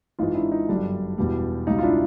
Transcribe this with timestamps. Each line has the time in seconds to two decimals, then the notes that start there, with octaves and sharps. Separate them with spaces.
0.19 G#1 G#2 E3 D#4 F4
0.35 D4 E4
0.52 D#4
0.68 G1 F#2 D3 G3 D4
1.18 E1 E2 B2 G3
1.67 C#2 B2 G3 D#4
1.79 F4
1.83 D4 E4